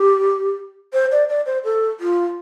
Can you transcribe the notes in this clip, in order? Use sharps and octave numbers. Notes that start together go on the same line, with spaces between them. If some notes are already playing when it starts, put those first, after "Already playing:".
Already playing: G4
C5
D5
D5
C5
A4
F4